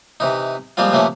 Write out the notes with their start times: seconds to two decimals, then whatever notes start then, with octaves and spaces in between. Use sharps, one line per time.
0.20 C3 E3 D#4
0.77 F3 G3 G#3 A#3 C4 F4
0.93 C3 E3 F3 A3 A#3 C#4